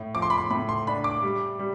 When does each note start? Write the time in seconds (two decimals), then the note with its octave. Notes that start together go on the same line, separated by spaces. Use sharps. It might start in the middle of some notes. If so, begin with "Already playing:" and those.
Already playing: A2
0.14 F3 D6
0.22 C6
0.30 B5
0.38 C6
0.50 A2 B5
0.69 C6
0.87 D4 B5
1.04 D6
1.23 G3
1.59 G3